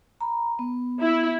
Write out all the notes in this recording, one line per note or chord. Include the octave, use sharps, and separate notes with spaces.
A#5 B5
B3
E4